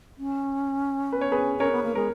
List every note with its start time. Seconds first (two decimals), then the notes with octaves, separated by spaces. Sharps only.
0.18 C#4
1.12 B4
1.21 C#5
1.32 G#4 B4
1.59 C#4 A#4 C#5
1.72 B3
1.83 A#3
1.95 G#3 A#4